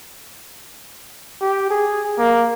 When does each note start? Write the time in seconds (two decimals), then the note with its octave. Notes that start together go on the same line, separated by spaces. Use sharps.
1.41 G4
1.70 G#4
2.18 A#3